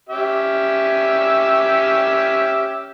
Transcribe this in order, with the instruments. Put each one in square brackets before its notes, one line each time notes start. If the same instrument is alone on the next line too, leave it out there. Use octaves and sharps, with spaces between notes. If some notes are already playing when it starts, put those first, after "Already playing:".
[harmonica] C#4 G4 E5